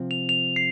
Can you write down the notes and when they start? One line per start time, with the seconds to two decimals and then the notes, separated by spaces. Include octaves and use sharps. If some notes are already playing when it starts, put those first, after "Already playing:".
Already playing: C3 F3 C4
0.11 F7
0.29 F7
0.56 C7